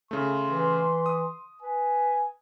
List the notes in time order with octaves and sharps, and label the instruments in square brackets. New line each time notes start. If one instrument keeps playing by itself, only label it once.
[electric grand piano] C#3 A3 [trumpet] C6
[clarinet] E3
[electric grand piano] D#6
[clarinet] B4 [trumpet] G#5